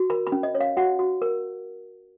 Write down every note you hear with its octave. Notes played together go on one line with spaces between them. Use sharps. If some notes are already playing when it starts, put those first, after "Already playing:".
Already playing: F#4
A#4 B5
B5
C#4
D#5
C#5
F5
F#4 F#5
F#4
A#4